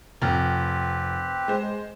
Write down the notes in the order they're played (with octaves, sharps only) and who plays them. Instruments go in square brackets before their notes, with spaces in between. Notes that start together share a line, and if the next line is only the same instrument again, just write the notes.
[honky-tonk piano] F1 F6 [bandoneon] C4 G4 B4
[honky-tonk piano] G#3 C5